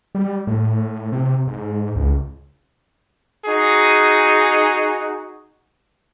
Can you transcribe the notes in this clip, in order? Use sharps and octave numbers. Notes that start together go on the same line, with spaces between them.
G3
A2
C3
G#2
C#2
D#4 F#4 G#4